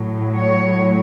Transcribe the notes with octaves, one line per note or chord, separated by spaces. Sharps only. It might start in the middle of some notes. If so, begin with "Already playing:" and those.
Already playing: A2 F#3
C#5